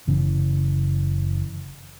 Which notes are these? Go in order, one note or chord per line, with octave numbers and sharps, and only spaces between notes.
F#1 C#3 E3 C#4